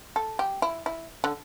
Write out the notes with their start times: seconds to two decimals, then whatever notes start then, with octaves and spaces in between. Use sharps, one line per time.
0.16 A4
0.39 G4
0.62 E4
0.86 E4
1.24 D3